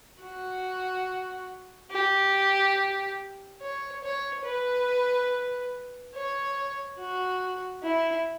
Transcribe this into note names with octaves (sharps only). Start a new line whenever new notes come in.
F#4
G4
C#5
C#5
B4
C#5
F#4
E4